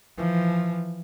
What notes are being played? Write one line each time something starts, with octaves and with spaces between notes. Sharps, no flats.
E3 F3